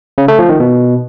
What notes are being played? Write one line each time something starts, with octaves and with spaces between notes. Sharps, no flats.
C#3
A3
F3
D#3
B2